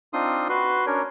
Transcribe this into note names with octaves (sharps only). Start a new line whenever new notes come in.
C4 D4 D#4 F4 C6 D#6
F#4 B4 C6
C#4 D4 A#4 C#5